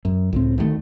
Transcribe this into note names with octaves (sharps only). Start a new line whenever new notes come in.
F#2
C#2 A2 C4
D2 D#3 F3 A3